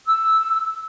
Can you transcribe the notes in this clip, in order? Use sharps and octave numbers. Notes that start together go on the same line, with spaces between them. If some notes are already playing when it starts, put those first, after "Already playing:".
E6